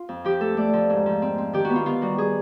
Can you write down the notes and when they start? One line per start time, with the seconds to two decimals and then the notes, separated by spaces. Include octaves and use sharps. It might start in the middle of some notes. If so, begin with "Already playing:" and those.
Already playing: F4
0.09 F2
0.25 F3 G4
0.40 A3 A4
0.57 A3 D5
0.73 F3
0.90 G#2
1.06 F3
1.22 C4
1.38 C4
1.53 D#3 G4
1.65 F#4
1.70 B3
1.76 F4
1.86 D#3 F4
2.02 G3 F#4
2.18 G3 G#4